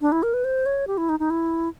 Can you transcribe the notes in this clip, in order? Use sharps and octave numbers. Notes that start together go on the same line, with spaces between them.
D4
E4
A#4
B4
C5
C#5
G4
E4
D#4
D#4
E4